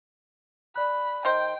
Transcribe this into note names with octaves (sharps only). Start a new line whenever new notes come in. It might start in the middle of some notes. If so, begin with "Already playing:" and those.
D5 B5 F#6
D#3 C5 D#5 G5